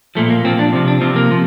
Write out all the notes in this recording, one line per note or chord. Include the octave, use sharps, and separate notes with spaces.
A#2 F3 A3
A#3
A#2 F3 C4
D4
C3 F3
D4
C3 F3 C4
A#3
C3 F3